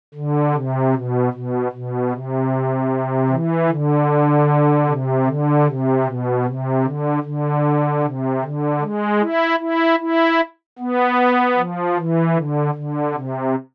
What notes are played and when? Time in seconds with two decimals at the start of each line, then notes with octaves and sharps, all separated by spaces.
0.15 D3
0.53 C3
0.93 B2
1.33 B2
1.72 B2
2.11 C3
3.29 E3
3.69 D3
4.87 C3
5.26 D3
5.66 C3
6.05 B2
6.45 C3
6.83 D3
7.23 D3
8.02 C3
8.42 D3
8.81 G#3
9.21 E4
9.60 E4
10.00 E4
10.79 B3
11.56 F3
11.97 E3
12.36 D3
12.75 D3
13.14 C3